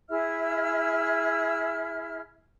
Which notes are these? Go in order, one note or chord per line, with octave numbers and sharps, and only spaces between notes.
E4 G#4 E5 F6